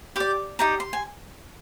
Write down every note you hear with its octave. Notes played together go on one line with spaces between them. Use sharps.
G4 D5 D6
D#4 G4 D5 A#5
C6
G#5